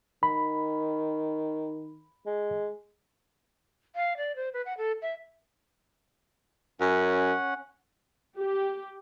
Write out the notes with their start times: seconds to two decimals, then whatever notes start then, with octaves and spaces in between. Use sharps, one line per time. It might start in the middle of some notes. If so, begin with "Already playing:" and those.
0.23 D#3 B5
2.26 G#3
3.96 F5
4.17 D5
4.36 C5
4.54 B4
4.66 F#5
4.78 A4
5.02 E5
6.80 F#2 C#4 F#5
8.38 G4